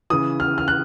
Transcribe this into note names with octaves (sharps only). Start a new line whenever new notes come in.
C#3 E3 D#6
F6
F6
F#6